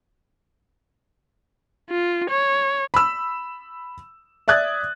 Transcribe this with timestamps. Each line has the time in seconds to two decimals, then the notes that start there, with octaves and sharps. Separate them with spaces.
1.90 F4
2.30 C#5
2.94 B5 E6
4.48 D5 E5 D#6 F#6 G#6 A6